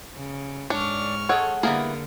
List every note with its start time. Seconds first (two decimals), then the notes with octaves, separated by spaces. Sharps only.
0.13 C#3
0.70 G#2 D4 C#5 C#6 F6
1.29 G#3 G#4 A4 C#5 F#5
1.63 D3 G3 A#3 B3 E4 G#4 A#4